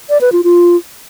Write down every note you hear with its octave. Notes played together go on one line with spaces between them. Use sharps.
D5
B4
F4
F4